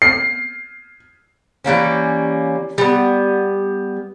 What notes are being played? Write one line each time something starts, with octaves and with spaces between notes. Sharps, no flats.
C7
E3 G3 A#3 C#4
G3 B3